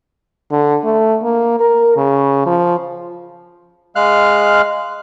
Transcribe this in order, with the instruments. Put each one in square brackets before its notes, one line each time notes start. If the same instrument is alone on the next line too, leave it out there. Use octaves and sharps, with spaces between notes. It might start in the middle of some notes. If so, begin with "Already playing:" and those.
[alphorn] D3
A3
A#3
A#4
C#3
F3
[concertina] G#3 F5 F6 F#6